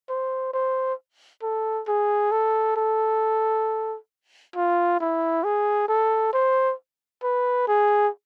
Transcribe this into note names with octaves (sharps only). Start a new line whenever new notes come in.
C5
C5
A4
G#4
A4
A4
F4
E4
G#4
A4
C5
B4
G#4